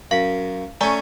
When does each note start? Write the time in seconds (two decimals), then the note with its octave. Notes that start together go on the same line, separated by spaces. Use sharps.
0.11 F#2 F5 B6
0.81 A3 C#4 D5 G#5 A#5